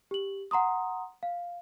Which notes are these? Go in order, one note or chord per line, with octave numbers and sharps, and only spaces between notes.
G4 F#7
F#5 A#5 C6 D#6
F5